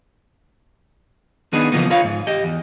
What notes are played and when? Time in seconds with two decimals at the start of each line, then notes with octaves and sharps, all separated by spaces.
1.53 D#3 B3 D4 D#4 G#4 B4
1.72 C#3 E3 F3 A#3 B3
1.90 F4 A#4 B4 C#5 F5
2.04 G#2
2.27 G4 D#5
2.44 E2